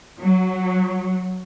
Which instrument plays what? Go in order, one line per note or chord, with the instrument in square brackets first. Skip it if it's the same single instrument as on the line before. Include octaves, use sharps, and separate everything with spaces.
[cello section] F#3